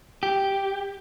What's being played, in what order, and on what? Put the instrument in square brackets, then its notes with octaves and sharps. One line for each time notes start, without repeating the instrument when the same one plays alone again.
[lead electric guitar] G4